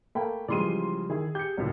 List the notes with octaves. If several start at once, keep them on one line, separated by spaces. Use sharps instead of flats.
A3 A#3 G5 G#5 B5
C#3 E3 F3 G3 G#3 D5 C6 D#7
D#3 E4 G#4
G4 G6 C#7
C#2 F#2 A2 F#3